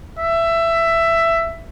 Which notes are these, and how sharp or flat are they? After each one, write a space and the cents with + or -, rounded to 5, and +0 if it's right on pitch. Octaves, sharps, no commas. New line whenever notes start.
E5 +15